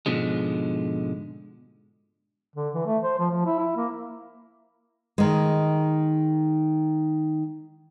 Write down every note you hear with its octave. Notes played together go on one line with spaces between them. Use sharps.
G#2 B2 D3 F3 G#3
D3
E3
A3
C5
F3
F3
E4
E4
A#3
D#3 G#3